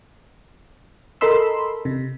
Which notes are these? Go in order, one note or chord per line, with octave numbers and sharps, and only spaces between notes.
A4 A#4 D#5 B5 C6 E6
C3